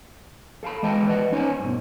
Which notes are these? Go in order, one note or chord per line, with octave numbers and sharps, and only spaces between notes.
A4 F5 A5 B5
E3 G#3 D#5 G5 A5
B4 D5 D#5 F#5
C#4 D#4 C5 C#5 G5 G#5
G2 B2